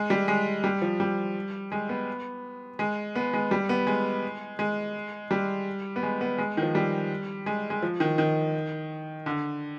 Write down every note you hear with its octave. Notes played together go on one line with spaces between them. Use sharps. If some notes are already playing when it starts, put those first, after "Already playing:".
Already playing: G#3
G3
G#3
G3
F3
G3
G#3
B3
G#3
B3
G#3
G3
B3
G#3
G#3
G3
B3
G#3
B3
G#3
D#3
F3
G3
G#3
G#3
F3
D#3
D#3
D3